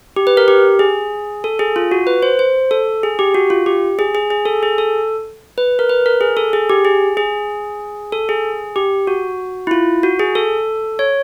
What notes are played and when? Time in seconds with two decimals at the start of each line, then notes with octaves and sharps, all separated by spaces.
0.16 G4
0.27 B4
0.37 A#4
0.48 G4
0.79 G#4
1.44 A4
1.59 G#4
1.76 F4
1.91 F#4
2.07 B4
2.23 C5
2.39 C5
2.71 A4
3.03 G#4
3.19 G4
3.34 F#4
3.50 F4
3.66 G4
3.99 G#4
4.15 G#4
4.30 G#4
4.45 A4
4.63 G#4
4.78 A4
5.58 B4
5.79 A#4
5.89 B4
6.06 A#4
6.21 G#4
6.37 A4
6.53 G#4
6.70 G4
6.85 G#4
7.17 G#4
8.12 A4
8.29 G#4
8.76 G4
9.07 F#4
9.67 E4
9.71 F4
10.03 F#4
10.19 G#4
10.35 A4
10.99 C#5